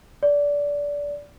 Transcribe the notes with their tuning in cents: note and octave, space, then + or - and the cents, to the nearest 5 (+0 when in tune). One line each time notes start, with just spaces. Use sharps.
D5 -20